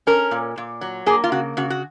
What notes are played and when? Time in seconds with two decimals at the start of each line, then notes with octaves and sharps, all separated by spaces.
0.07 C#4 A#4
0.31 A#2
0.58 A#2
0.81 F#3
1.06 A#3 G#4
1.24 F4
1.32 C#3 F#4
1.57 C#3 F#4
1.70 F#4